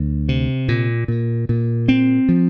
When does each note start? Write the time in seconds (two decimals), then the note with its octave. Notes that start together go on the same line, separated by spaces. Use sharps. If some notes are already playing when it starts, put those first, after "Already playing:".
Already playing: D2
0.29 C3
0.68 A#2
1.08 A#2
1.49 A#2
1.88 C4
2.29 F3